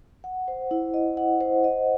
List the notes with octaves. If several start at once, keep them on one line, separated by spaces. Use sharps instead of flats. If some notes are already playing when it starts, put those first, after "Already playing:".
F#5
C5
E4
D#5
F#5
C5
D#5